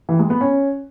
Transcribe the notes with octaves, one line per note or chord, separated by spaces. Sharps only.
E3
G#3
B3
C#4